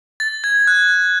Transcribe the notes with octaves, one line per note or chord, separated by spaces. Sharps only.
A6
G#6
F#6